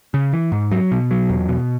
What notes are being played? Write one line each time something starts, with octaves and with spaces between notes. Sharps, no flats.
C#3
E3
G#2
F#3
B2
F#3
E2
B2